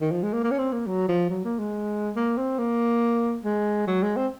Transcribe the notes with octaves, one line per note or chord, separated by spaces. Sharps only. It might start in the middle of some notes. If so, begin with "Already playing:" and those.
D#3
F3
G#3
A#3
A#3
C#4
C4
A#3
F#3
F3
F#3
A#3
G#3
A#3
C4
A#3
G#3
F#3
G#3
C4